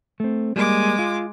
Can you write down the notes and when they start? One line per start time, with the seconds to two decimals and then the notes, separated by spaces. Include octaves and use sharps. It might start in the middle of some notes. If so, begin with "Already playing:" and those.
0.20 A3 C4
0.56 G3 G#3 A#3 D6
0.99 F4